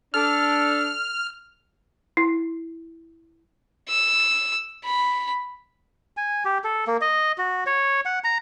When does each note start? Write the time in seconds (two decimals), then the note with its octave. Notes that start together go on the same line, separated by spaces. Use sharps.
0.14 D4 A4 F6
2.17 E4
3.89 E6
4.85 B5
6.17 G#5
6.45 G4
6.64 A4
6.87 A#3
7.01 D#5
7.38 F#4
7.66 C#5
8.05 F#5
8.24 A#5